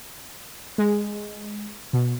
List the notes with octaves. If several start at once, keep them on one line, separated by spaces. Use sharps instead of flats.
G#3
B2